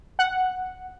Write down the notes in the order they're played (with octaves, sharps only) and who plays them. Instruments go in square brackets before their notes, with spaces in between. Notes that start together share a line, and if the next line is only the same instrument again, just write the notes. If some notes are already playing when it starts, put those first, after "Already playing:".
[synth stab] F#5